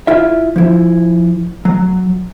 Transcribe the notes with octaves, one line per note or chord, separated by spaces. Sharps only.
E4 F4 E5
F3 E4
F#3